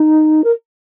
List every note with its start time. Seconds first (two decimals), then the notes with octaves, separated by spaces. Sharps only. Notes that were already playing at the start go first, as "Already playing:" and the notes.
Already playing: D#4
0.44 A#4